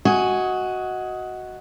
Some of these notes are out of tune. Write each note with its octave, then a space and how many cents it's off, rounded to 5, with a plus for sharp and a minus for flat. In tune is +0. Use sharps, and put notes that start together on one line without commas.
F#4 +0 D#5 +20 G#5 +0